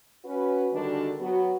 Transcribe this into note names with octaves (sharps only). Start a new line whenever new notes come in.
C#4 F#4 B4
D3 D#3 G3 G#3 D4 F#4
F#3 B3 F#4